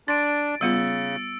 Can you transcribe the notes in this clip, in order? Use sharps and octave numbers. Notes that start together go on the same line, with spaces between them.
D4 C6 A6 D7
C#3 G3 B3 F4 E6 C#7